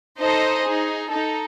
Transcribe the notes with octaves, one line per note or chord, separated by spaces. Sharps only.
D#4 A4 C5 D#5
D#4 G#4
D#4 A4